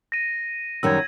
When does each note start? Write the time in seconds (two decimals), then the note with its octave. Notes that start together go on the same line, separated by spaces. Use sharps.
0.12 A#6 D#7
0.83 F#2 D#3 G3 E6 G#6